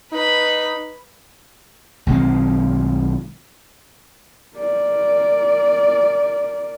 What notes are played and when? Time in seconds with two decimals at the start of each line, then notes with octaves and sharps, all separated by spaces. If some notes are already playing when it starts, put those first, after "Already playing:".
0.13 D#4 B4 B5
2.07 B1 D#3 G#3 C4
4.57 A#4 D5